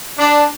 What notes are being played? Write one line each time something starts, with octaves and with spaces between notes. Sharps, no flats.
D4